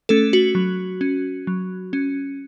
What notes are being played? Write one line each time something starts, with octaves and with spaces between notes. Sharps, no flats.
A3 C#4 A4
F#4
F#3
C#4
F#3
C#4